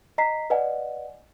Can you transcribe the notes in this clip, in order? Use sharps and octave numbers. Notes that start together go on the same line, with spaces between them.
D#5 A#5 B6 C7
B4 D5 D#5 F#5 G#5